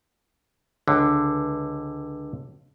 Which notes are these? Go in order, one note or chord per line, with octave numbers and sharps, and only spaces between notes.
C#2 D3